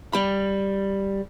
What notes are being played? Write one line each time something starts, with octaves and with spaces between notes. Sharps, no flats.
G3 B5